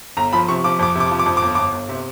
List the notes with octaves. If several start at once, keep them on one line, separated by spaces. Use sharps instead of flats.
G1 A#5
F3 B5
C3 C#6
F3 D6
F2 D6
C3 D6
F3
D6
F2
D6
G1
G1 D6
G1
C3